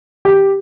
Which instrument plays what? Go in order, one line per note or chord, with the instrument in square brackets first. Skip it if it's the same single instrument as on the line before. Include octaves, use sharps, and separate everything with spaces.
[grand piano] G4